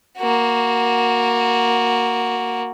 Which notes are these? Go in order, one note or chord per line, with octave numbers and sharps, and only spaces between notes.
A#3 F#4